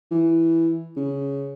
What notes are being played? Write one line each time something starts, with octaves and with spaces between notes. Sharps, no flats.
E3
C#3